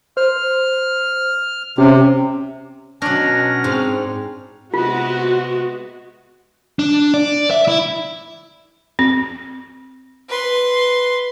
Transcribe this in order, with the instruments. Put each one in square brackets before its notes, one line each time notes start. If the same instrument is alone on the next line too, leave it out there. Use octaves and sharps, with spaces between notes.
[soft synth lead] C5 [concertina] F6
[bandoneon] C3 [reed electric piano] C#4 [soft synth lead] G4
[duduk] B2 [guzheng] F#3 D4 [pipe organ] C#4 F6 A#6
[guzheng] G#2 [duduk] C4
[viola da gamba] C3 G#3 B3 [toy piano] F4 [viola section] F#4
[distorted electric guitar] D4
D5
E5
E4
[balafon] C4
[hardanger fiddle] B4 C6